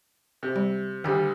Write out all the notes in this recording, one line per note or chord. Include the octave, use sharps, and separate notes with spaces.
C3
G3
D2 D#3 G3 G4